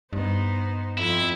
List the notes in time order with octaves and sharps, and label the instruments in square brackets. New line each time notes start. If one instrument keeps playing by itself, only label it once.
[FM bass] G2 [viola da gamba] B3 D#4 C5
[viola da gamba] F2 C4 [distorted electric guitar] E4